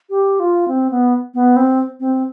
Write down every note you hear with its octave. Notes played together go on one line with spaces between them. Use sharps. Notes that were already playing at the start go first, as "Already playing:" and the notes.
G4
F4
C4
B3
B3
C4
C4